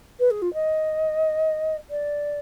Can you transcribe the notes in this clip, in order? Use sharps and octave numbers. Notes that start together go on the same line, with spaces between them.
B4
G#4
F4
D#5
D5